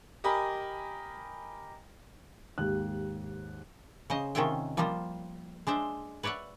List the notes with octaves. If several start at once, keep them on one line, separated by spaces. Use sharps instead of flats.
G4 A#4 D#5 G#5 B5
D#2 G#2 G4 F#6
C#3 C5 D#5
C3 D#3 C#4 F4 E5 G5
F3 G3 A#3 F4 C5
G#3 D4 C5 E5
B4 C#5 D5 E5 F#5